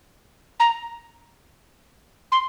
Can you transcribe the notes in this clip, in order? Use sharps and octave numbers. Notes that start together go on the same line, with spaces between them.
A#5
C6